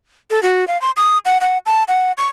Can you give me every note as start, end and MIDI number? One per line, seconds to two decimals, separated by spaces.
0.31 0.42 69
0.43 0.67 66
0.68 0.80 77
0.82 0.91 84
0.97 1.18 87
1.25 1.38 78
1.41 1.58 78
1.66 1.84 81
1.88 2.12 78
2.18 2.27 85